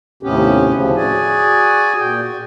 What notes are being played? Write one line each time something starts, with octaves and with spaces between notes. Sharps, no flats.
D#2 A2 C3 B3 C#4 G4
D2 A2 C#3 F3
F#4 G#4 D5 G#5
A#2 G5
F#4